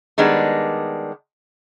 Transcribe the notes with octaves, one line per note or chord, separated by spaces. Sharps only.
D#3 G3 G#3 B3 D4